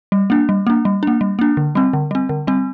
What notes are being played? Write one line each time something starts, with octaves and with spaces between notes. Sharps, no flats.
G3
A#3 D4
G3
A#3 D4
G3
A#3 D4
G3
A#3 D4
D3
G3 C4
D3
G3 C4
D3
G3 C4